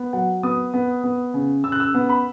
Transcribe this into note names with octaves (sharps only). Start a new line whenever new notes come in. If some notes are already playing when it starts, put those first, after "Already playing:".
Already playing: B3
F#3 F#5
B3 D#6
B3
B3
C#3
C#3 E6
F#6
E6
B3
B5